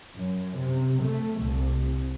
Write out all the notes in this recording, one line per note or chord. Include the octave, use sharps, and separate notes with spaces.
F#2
C3
A3
C2